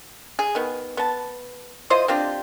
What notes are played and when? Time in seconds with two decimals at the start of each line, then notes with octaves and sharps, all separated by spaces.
0.39 G#4
0.55 D#3 B3
0.97 B3 A5
1.90 E4 F4 C5 D#5
2.08 C4 D4 F4 G4